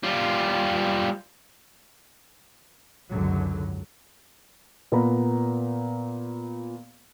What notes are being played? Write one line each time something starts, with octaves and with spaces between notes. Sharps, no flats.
G3 F4
G#1 C#2 F#2 D3 F#3
A#2 B3 A#4 A#5 B5